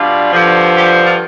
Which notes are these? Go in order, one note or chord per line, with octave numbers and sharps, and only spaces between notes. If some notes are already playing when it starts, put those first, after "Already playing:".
Already playing: B2 G3 D4 F4
G2 D3 F3
G4
F4